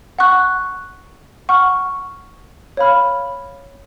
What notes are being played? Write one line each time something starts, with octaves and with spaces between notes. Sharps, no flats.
F#5 C#6 F#6
F#5 C#6 F6
C#5 F5 B5 F6